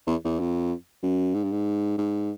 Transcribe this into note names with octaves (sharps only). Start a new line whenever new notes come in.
E2
E2
F2
F#2
G#2
G2
G#2
G#2